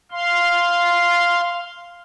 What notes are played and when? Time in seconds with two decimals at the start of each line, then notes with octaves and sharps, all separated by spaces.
0.11 F5 C6